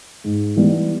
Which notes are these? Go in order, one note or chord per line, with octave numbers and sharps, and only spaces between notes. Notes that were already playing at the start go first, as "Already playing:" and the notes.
G#2
E3 G3 B3